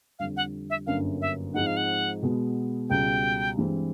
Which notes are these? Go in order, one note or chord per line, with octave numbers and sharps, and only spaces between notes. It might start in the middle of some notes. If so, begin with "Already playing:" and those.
F2 D3 G3 F5
F#5
E5
G1 F#2 D3 F#3 A#3 F5
E5
G#2 F3 G#3 C4 D#4 F#5
F5
F#5
B2 G#3 B3
C#2 B2 G3 G5
G2 E3 G#3 C4